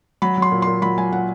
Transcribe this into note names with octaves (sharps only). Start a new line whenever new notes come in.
F#3 B5
F#3 C6
A#2
A#2 C6
F#3 B5
F#3 G#5
A#2 F#5